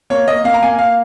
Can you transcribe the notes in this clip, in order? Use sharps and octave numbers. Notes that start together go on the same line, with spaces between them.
A#3 C#5
A#3 D#5
A#3 F5
A#5
A#3 G#5
A#3 F5